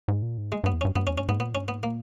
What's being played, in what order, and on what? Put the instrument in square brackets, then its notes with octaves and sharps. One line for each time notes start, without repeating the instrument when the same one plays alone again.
[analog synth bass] G#2
A#2
G#2
[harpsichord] G#3
[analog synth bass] G2 [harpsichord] B3
[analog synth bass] E2
[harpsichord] C#4
[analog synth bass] G2
[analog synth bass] G2 [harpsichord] B3
[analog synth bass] E2 [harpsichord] C#4
[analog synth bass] G2 [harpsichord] C#4
[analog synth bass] G#2 [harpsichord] B3
[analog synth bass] A#2 [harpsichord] B3
[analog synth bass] G2 [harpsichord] C#4
[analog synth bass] G#2 [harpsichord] B3
[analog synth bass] A#2 [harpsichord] A#3